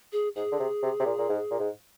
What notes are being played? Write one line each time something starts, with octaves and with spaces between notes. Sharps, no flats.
G#4
G#2 G#4
D3
C3
C3
C3
A#2
A#2
G#2
A#2
G#2